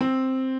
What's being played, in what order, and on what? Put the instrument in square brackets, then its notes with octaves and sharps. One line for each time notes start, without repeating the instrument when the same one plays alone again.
[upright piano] C4